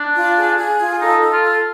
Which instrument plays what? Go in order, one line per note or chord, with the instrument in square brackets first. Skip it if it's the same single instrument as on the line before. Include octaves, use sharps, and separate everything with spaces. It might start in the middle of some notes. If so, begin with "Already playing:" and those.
Already playing: [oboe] D4
[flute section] F4
G#4
G#4
F4
[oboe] D#4 [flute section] A4
[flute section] A4
[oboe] F4
[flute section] A4